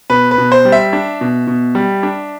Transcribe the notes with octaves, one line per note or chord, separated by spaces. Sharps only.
B2 B4
B4
B2
C5
G3
E5
D4
B2
B2
G3
D4